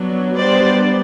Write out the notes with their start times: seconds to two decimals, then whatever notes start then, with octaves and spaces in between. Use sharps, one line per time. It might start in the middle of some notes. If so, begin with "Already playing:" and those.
Already playing: F#3 B3 D4
0.37 G3 B3 D4 C5 D5